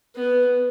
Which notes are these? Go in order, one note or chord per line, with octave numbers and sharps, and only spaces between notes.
B3